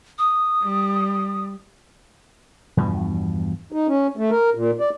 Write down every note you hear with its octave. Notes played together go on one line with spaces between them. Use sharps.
D#6
G3
E2 G2 B2 F3
D#4
C#4
A3
A#4
A#2
D5